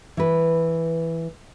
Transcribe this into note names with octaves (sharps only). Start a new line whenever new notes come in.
E3 B4